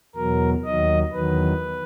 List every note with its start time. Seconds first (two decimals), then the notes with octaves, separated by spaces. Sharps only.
0.15 E2 B2 F#3 A#4
0.65 D#2 D#3 F#3 D#5
1.13 E2 D#3 F#3 B4